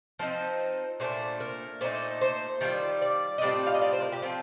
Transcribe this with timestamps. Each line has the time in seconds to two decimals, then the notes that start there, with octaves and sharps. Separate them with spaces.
0.19 F3 C4 D#4 C5
1.00 A#2 A3 D4 C5
1.40 A#4
1.81 A#2 A3 D#4 C5
2.21 C5
2.61 D#3 G3 D4 F4
3.02 D5
3.38 D#5
3.41 A2 G3 C4 F4 D5
3.67 F5
3.74 D#5
3.82 D5
3.93 C5
4.02 A#4
4.13 G4
4.22 F3 C4 F4